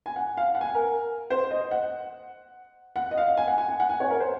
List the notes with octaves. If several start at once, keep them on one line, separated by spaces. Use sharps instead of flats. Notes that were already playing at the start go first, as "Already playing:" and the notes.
G#5
F#5
F5
F#5
G#5
A#4
C5
D#5
F#5
F#5
D#5
F5
G#5
F#5
G#5
G#5
F#5
G#5
C#5
A#4
C5